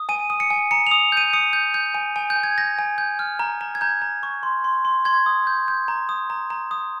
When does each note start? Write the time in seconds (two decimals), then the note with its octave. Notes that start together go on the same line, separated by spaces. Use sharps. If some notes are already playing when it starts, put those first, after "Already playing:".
Already playing: D#6
0.09 G#5 D#7
0.30 D#6
0.40 C#7
0.50 G#5
0.71 A#5 C#7
0.87 D#6 F7
1.12 G6 D#7
1.33 D#6 C#7
1.53 G6
1.74 G6
1.94 G#5
2.16 G#5
2.30 G6
2.36 G#5
2.43 G#6
2.58 G6 A#6
2.78 G#5
2.98 G6
3.19 F6
3.39 A#5
3.61 A#5
3.75 G#6
3.81 A#5 G6
4.02 A#5
4.23 C#6
4.43 C6
4.64 C6
4.85 C6
5.05 C6 G#6
5.26 D#6
5.47 G6
5.68 G6
5.88 A#5
6.09 D#6
6.30 A#5
6.50 A#5
6.71 D#6